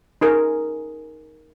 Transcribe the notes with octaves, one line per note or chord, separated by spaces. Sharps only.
D#4 G#4 A#4